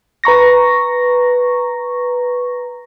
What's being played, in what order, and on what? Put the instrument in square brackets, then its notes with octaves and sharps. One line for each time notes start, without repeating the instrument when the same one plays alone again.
[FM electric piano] B4 A#5 C#6 A#6